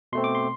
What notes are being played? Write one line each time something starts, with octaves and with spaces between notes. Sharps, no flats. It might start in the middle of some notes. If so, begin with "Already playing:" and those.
B2 A3 C4 C6
D6
C6